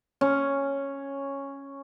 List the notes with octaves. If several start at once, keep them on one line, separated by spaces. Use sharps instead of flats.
C#4